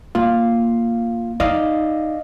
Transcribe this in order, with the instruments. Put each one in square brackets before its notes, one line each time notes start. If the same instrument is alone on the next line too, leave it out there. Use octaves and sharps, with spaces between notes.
[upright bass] A#3 [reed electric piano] F4 F5
[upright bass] D#4 [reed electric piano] D5 D#5 F5